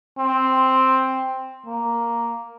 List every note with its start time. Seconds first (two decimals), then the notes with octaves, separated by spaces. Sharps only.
0.18 C4
1.66 A#3